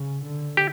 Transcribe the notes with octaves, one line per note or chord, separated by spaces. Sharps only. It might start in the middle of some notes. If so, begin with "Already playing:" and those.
Already playing: C#3
D3
G4